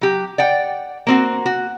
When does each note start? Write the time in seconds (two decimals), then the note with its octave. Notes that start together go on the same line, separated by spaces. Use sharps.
0.01 F#3 G4
0.38 D5 F#5 G5
1.07 A#3 C4 F#4
1.46 F#4